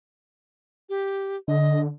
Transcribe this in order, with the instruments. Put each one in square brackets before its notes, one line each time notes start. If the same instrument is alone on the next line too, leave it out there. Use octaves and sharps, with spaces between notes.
[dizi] G4
[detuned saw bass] D3 [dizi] D#5